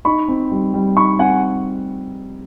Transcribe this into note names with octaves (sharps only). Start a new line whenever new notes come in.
D#4 B5 C#6
C4
G3
G3
D#4 B5 C#6
C4 F#5 G#5